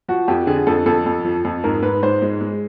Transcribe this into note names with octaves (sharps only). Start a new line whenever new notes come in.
F3 F#4
F2 G4
D3 G#4
F2 A4
F2 A4
F2
F3
F2
G#2 A#4
G#2 B4
G#2 C5
G#3
G#3